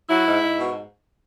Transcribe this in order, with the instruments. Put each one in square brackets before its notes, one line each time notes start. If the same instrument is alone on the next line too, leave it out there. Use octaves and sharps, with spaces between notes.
[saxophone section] F#3 E4
G#2
G#2
B2